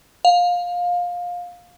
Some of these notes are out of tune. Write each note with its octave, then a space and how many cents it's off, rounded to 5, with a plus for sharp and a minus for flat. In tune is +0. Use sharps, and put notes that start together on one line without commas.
F5 +20